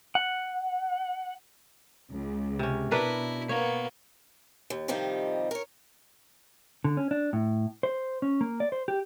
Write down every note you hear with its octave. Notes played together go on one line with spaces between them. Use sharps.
F#5
C#2
C3 C#4
B2 D4 E4 A#4 B4
A#3 B3 C#5
D#2
C3 D#3 F3 G3 D#4
A#4 C#5
D3
C#4
D4
A2
C5
C#4
A#3
D5
C5
G4